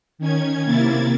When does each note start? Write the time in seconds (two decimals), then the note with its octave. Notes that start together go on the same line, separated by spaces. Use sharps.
0.18 D#3 C#4 G#6
0.65 C3 A#3 E4 G#6 A6